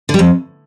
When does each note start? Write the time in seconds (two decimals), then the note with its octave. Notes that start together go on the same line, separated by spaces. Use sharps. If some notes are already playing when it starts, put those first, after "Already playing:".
0.09 D3
0.14 G3
0.19 F2